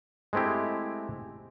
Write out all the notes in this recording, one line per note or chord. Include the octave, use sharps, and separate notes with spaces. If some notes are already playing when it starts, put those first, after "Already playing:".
G#3 A3 C4 E4 G4